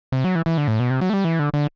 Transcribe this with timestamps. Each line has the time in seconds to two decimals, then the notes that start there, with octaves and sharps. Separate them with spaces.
0.12 C3
0.24 F#3
0.35 E3
0.46 E3
0.58 D3
0.68 A2
0.80 B2
0.90 C3
1.01 F#3
1.10 A3
1.13 G3
1.24 E3
1.39 D3
1.54 D3